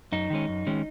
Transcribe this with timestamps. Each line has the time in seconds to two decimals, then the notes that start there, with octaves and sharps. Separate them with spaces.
0.12 F#2 D#4
0.30 D#3 G#3 C#4
0.48 F#2
0.67 D#3 G#3 C#4